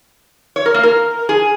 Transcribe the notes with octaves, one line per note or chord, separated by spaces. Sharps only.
C#5
A#4
A#3
A#4
G#4